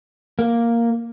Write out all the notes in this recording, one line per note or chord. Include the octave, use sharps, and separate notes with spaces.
A#3